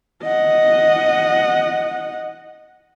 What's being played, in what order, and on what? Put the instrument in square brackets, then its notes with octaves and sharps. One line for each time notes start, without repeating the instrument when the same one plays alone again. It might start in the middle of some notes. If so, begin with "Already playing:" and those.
[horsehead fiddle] D#5 F#5